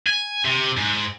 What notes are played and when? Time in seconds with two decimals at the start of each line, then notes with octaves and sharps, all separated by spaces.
0.06 G#5
0.45 C3
0.77 G#2